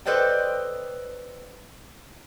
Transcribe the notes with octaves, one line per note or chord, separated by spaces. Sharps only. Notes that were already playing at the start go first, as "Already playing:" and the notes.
A4 B4 C5 D5 D#5 G5